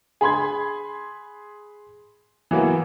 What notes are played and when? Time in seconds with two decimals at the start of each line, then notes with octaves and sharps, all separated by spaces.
0.21 G#4 B5 C6 G#6
2.51 E3 F#3 A#3 B3